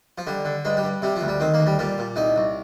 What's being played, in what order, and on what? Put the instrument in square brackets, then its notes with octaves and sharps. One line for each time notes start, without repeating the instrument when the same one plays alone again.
[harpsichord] F3
D3 G3
D3
G2 G#3
G3
G2
C3 G3
F3
D2
G3
D#3 C4
A#3
D2
G3
A#2 G3
A#2
C2 D#4
C2